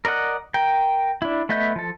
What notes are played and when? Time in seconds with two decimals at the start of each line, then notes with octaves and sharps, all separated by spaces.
0.05 A#4 D5 D#5 F#5
0.54 A#4 G5
1.22 D4 E4
1.49 A3 B3 D#5 E5 G6
1.76 F3 A4